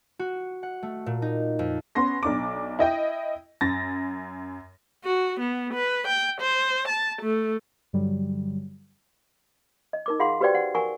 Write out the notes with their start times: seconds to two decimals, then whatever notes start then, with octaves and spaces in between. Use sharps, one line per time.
0.19 F#4
0.63 F#5
0.83 A3
1.06 A#2
1.22 D#4
1.59 F2
1.95 B3 C#4 C6 A#6
2.23 B1 D4 D6
2.79 E4 D#5 G5
3.61 F#2 A6 A#6
5.04 F#4
5.40 B3
5.74 B4
6.07 G5
6.41 C5
6.88 A5
7.22 A3
7.93 G2 D3 F#3 G3
9.93 D#5
10.06 D#4 A#4 D6
10.20 F4 G#4 F5 F#5 C6
10.40 F#4 G4 B4 C5 D5 G5
10.55 F#5
10.75 A#4 F#5 G#5 A#5 C#6